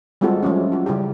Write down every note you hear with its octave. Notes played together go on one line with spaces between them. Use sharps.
G3 G#3 C4 F4 F#4 A4
F3 F#3 A3 C#4
F4 F#4
C#3 G3 E4 G4